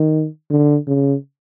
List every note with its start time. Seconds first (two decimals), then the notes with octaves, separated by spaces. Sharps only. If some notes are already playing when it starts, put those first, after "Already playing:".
Already playing: D#3
0.50 D3
0.87 C#3